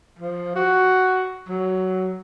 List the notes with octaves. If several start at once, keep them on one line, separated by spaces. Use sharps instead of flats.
F3
F#4
F#3